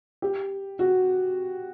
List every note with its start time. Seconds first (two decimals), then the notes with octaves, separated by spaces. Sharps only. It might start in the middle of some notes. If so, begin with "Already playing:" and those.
0.22 G4
0.79 F#4